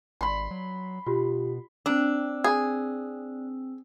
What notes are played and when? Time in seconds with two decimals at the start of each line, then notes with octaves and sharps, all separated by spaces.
0.21 G#1 B5 C6
0.51 F#3
1.06 B2 F4 G4
1.86 C4 D4 E6
2.44 G#4